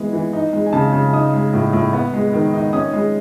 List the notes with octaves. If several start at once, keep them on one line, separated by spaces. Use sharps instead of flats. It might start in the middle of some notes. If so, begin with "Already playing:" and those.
Already playing: E3 G#3 B3
E3
D#4
G#3
G#5
C#3 A5
C#3
D#4 D#6
G#3
A2
A2
B3
G#3
D#3
D#4
C#4 D#6
G#3